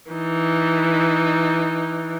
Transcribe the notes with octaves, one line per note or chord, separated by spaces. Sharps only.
E3 D#4